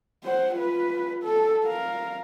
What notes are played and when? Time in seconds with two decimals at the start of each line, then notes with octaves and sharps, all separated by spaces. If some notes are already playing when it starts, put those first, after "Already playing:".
0.24 C5 F#5
0.55 F4 B4
1.24 A4
1.65 A#4 F5